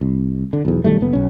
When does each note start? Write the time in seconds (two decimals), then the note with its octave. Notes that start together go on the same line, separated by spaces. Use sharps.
0.01 C2
0.53 D3
0.65 B1 E2
0.84 B1 D#3 G3 A3
1.01 F#1 B3
1.13 B1 C#4